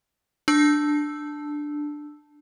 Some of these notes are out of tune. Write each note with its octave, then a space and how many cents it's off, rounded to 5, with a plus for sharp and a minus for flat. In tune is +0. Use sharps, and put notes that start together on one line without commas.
D4 +10 A5 +0 E6 +0